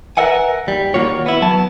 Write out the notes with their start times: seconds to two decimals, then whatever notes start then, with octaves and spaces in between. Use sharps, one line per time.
0.17 A#4 B4 D5 E5 F#5 G#5
0.67 D#2 G3
0.94 D#3 A#3 F4 F#4 C#5
1.26 B3 E4
1.42 F#3 B3 A5